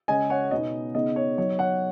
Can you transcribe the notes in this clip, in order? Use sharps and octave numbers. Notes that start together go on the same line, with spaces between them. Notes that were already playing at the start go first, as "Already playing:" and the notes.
C#3 G#3 C#4 D#5 G#5
C#5 F#5
B2 B3 D#4 D#5
C#3 B3 D#4 D#5
C#5
F#3 D#4 C#5
C#5 F#5